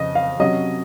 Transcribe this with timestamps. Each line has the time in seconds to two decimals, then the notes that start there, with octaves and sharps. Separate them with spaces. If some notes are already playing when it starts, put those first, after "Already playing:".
Already playing: F2 C#3 F3 D#5
0.15 F5
0.40 C3 F#3 C#4 D#5